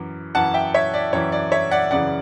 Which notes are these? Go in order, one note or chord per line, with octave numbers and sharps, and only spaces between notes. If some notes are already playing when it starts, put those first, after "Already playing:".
Already playing: F#2 E3
F#2 E3 F#5 A5
E5 G5
C#5 E5
D5
F#2 E3 C#5
D5
C#5 E5
D5 F#5
F#2 C#3 E3 D5 F#5